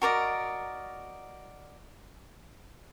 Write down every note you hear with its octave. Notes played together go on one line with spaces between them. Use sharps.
F#4 A#4 D5 D#5